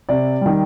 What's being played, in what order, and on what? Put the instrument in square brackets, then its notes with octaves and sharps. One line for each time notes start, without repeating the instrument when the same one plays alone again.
[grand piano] C3 D5
D#3 G3